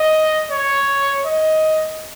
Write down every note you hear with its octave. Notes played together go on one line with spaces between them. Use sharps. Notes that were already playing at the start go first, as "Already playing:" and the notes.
Already playing: D#5
C#5
D#5